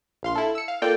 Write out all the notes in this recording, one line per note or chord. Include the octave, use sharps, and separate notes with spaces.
A#1 F5 C6
E4 A4
E6 C#7
F5
A#3 F4 A4 D5 G5